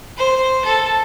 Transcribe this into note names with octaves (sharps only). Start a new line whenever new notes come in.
C5
A4